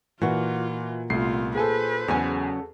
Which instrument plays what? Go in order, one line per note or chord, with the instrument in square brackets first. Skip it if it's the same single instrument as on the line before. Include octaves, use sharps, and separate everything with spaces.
[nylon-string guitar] A#2 F#4 [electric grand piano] E3 [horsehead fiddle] F4
[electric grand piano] C2 A3 C7 [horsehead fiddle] B3 F4
[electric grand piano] A#3 G#5 [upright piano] G#4 A4 [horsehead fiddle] B4 C5
[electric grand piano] E2 G#5 [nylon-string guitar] C#3 F#3 C#4